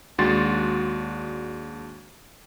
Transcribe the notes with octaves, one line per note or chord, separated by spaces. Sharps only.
D#2 G#3 D4 F#4 C6 A6